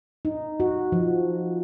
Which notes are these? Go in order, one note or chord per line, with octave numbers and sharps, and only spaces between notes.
D#4
F#4
F3